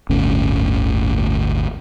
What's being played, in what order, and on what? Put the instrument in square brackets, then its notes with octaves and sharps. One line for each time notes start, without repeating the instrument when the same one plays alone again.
[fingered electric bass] G1 D2 A2 C#4